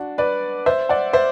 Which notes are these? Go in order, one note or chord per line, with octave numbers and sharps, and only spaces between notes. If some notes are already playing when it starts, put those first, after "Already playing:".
Already playing: D4 F#4
B4 D5
C5 E5
D5 F#5
C5 E5